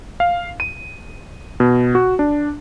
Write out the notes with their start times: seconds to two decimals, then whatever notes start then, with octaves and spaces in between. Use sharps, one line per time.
0.20 F5
0.60 D#7
1.60 B2
1.95 F#4
2.19 D4